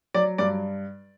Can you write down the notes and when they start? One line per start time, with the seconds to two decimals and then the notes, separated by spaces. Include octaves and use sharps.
0.14 F#3 D5
0.38 G2 D5